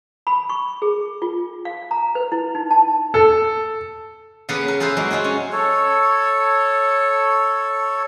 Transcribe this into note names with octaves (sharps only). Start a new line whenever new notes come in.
B5
C#6
G#4
F4
F5
A#5
B4
E4
D#4
A5
A4
C#3 A#3 B3 C#4 G#4 B4
A#4
F4 G#4 B4 C5 E5 F5
F#3 G#3 A#3 E4 F#4
G#3 F4 F#4 G#4
C#4
A4 C#5